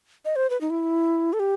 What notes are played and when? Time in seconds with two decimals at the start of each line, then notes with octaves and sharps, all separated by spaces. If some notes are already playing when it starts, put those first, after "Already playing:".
0.25 D#5
0.36 C5
0.50 B4
0.61 D#4
0.70 E4
1.33 A4
1.39 G4